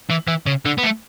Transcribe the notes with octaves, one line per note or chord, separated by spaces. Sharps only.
E3
E3
C#3
D3
B3
A3